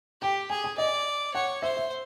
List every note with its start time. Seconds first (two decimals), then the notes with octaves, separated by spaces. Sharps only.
0.21 G4 G5
0.50 G#4 G#5
0.64 G#5
0.77 D5 D#5
1.33 C#5 F#5
1.62 C5 E5
1.77 E5